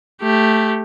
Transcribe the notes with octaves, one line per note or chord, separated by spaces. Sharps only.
A3 G4